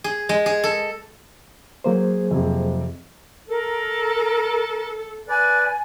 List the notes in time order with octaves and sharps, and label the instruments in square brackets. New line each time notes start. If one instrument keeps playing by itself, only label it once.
[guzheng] G#4
G#3
G#4
A4
[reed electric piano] F#3 A#3 C5 [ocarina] G#4
[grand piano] F2 C3
[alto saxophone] A4 [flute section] A#4
[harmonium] B4 D5 [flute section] G#5